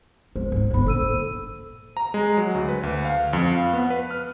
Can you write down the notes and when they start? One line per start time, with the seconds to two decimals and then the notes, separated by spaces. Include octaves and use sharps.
0.36 G#3 C5
0.52 G#2 D#4
0.71 G1 D3 C5 B5
0.86 A#1 A4 E6 D#7
1.97 A#5
2.14 G#3
2.37 F#3
2.55 D2
2.69 B4
2.83 D2
3.05 F5
3.33 F2
3.52 F5
3.73 B3
3.90 B4
4.11 F6